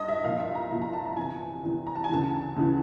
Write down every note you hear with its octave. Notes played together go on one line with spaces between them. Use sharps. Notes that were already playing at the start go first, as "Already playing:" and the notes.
Already playing: G2 D#5
E5
C2 A#2 F3 F5
E5
A#5
C2 A#2 F3
A#5
A5
A#5
E2 C3 E3 G#5
E2 C3 E3
A#5
A5
G#5
D2 C#3 E3 A5
D2 C#3 E3